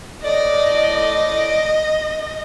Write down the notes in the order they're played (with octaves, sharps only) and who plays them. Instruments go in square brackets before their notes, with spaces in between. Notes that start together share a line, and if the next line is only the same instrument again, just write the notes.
[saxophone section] A2 D5 [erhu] D#5